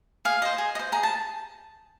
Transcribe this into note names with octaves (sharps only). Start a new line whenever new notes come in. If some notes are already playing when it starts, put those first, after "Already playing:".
G#4 F5
C5 D#5
G#4
D#5
C5
G#4 A#5
A5